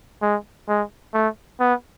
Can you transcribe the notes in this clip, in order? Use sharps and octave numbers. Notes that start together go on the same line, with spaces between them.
G#3
G#3
A3
B3